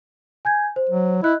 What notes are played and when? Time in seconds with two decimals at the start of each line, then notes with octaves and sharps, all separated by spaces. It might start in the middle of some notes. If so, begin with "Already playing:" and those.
0.45 G#5 G6 G#6
0.76 C5
0.90 F#3
1.23 E4 D#5 F#6